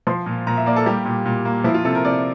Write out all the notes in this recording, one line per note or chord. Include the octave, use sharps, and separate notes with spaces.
F3 C6
A#2
A#2 A#5
E5
A#3 D5
A4
G3 G4
A#2
A#2
A#3
F3 E4
F4
C3 A4
A#4
C3 D5